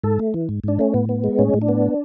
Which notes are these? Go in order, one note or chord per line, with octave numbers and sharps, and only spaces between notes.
G#2 A4
A3
E3
G#2
G#2 D4
A3 C#4
A2 B3
B3
G#3
A2 C#4
A2
D4
B3